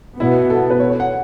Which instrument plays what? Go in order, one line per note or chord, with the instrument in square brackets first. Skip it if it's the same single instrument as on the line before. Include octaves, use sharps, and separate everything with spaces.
[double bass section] B2 B3 [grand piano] E4
[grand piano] A4
B4
C#5
C#5
F#5